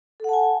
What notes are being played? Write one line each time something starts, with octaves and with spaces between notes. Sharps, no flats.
A4 F#5 G#5 A5